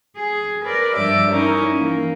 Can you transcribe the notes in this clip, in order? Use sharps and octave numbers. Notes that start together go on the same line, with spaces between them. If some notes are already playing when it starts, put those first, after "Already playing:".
G#4
A#4 B4 D5
G2 F3 G4 D5 E5 D6
C#4 D#4 E4 A#4
E3 A#3